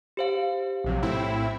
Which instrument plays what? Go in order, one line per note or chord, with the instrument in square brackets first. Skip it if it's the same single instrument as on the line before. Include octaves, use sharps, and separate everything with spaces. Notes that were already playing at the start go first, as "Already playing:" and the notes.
[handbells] G4 C5 F5
[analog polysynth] A#1 C3 F#3
A2 C4 E4